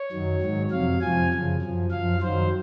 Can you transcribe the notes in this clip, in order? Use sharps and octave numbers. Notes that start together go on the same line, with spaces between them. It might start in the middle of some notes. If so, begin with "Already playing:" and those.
Already playing: C#5
F#2 D#3 F#3
G#2 D#3 F#3
F2 C3 F#3 F5
F2 C3 F3 G#5
F#2 C#3 F3
F#2 F3
F#2 F3 F5
F#2 D#3 F#3 C5